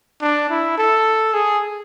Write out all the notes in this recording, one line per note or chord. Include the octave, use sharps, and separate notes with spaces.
D4
E4
A4
G#4